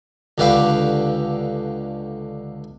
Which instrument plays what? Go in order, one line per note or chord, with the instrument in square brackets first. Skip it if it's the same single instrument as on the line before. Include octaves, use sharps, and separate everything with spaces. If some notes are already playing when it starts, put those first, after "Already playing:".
[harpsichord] C#2 D3 G4 B4 F5